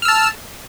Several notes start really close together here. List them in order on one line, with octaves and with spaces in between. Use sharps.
F6 E6 A5